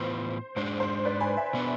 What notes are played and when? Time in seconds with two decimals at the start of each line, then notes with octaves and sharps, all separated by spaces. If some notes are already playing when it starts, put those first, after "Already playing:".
Already playing: A2 E3 B3 F4 B4 C5
0.56 G#2 G#3 D4 C5
0.80 C5
1.05 B4 D5
1.20 G#5 B5
1.37 E5 G#5
1.53 B2 B3 D4